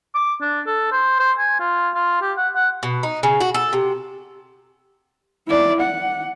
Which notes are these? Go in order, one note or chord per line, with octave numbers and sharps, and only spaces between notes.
D6
D4
A4
C5
C5
G#5
F4
F4
G4
F#5
F#5
B2
D#4
C#3
F#4
A4
C3
E4 D5
F#5